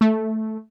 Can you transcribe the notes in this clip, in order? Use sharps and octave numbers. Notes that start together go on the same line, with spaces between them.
A3